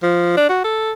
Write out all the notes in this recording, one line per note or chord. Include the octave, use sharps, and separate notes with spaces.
F3
D4
F#4
A4